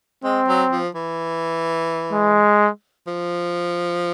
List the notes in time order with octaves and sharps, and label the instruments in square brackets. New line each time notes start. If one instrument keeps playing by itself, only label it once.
[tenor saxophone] G#3 [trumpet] C4
[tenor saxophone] F#3
F3
E3
[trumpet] G#3
[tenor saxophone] F3